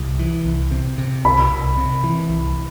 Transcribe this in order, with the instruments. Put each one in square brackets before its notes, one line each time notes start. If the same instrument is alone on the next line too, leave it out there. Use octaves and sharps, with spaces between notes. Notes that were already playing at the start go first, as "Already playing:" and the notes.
Already playing: [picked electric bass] C2
E3
C2
C3
C3
[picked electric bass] C2 [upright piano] B5
[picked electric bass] C2
C3
E3
C2